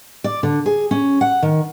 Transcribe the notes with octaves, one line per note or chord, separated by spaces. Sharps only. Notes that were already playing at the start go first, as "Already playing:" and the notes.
D5
D3
G#4
C#4
F#5
D#3